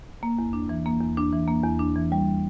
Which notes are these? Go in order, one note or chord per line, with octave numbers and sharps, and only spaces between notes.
A#3
E2
D4
E3
A#3
E2
D4
E3
A#3
E2
D4
E3
G3